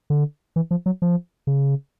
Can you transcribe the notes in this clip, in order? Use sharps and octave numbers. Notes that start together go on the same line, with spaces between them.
D3
E3
F3
F#3
F3
C#3